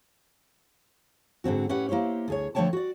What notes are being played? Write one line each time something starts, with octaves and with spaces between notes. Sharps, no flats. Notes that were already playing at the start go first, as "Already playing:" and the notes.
G#2 D3 C4 F#4
A2 C#4 G4 B4 F#5
A#3 E4 G4 C5 C#5
D2 G#4 C#5
D3 F3 A3 C#5 G5 A5
F#4 D5